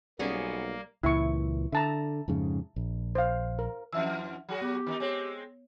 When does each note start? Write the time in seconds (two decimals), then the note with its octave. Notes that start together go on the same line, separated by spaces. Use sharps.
0.19 B1 G3 A#3 B3 C#4 G#4 D5
1.03 C#2 A#2 E3 E4 E5 C#6
1.72 D3 E5 A5 A#5
2.28 F2 G#2 C#3
2.76 A#1
3.15 C5 F5
3.59 A#4
3.93 F2 E3 E5 E6
4.49 F#3 F#4 G#4
4.61 B3 G4
4.86 D#3 C4 D#4
5.00 G#3 C4 C#5